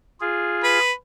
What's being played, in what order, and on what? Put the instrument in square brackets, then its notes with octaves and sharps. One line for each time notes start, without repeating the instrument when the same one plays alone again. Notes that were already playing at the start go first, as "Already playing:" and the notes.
[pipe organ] F4 G#4
[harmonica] B4